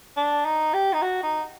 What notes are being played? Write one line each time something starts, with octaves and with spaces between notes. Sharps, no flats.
D4
D#4
G4
D#4
F#4
D#4